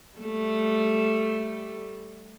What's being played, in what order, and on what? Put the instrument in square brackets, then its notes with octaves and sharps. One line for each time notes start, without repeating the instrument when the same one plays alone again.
[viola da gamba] G3 A3